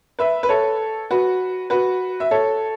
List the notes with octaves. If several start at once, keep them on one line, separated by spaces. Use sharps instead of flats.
B4 E5
B4
A4 C#5
F#4 B4
F#4 B4
E5
A4 C#5